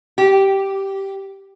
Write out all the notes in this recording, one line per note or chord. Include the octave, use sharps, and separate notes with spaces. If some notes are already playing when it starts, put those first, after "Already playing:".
G4